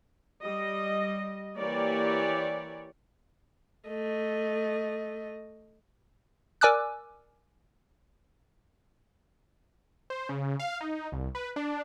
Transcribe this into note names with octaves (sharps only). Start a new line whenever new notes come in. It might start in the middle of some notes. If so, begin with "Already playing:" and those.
G3 D#5
E3 A#3 G4 C#5 D5
A3 D#5
A#4 D5 G#5 D6 E6 F#6
C5
C#3
F5
D#4
C2
B4
D4